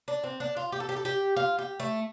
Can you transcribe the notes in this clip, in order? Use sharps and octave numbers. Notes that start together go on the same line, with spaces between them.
D4
C4
D4
F4
G4
A4
G4
A4
G4
F4
G4
A3